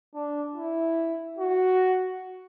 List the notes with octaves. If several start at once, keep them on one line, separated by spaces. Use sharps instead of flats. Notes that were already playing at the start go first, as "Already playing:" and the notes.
D4
E4
F#4